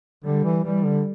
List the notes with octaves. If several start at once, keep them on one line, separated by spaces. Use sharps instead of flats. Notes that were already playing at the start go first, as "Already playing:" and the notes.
D3 G3
E3
E3 G3
D3